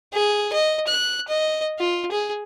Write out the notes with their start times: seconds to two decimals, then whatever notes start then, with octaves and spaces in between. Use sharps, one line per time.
0.14 G#4
0.53 D#5
0.87 F#6
1.28 D#5
1.79 F4
2.11 G#4